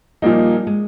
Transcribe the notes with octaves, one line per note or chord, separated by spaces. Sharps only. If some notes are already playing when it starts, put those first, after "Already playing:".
A#2 F3 G3 A#3 D#4
G#3